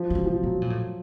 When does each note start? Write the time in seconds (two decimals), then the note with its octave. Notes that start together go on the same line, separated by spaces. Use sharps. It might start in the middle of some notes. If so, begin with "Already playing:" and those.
Already playing: F3
0.09 D3 F#3
0.15 C#3
0.26 C3 F3
0.43 B2 F#3
0.62 A#2
0.70 A2